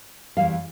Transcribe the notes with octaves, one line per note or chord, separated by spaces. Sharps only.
E2 C#3 E3 G3 F5